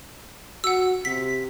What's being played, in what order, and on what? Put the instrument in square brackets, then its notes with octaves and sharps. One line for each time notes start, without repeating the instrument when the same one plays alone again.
[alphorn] F#4 [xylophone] F#5 E6
[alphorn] C3 [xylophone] B6